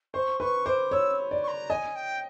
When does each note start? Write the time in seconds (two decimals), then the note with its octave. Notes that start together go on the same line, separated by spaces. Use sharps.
0.14 C5 C#6
0.40 B4 C#6
0.66 C5 D6
0.91 C#5 E6
1.31 D5
1.43 C#6
1.48 A#5
1.70 D#5 G#5
1.95 G5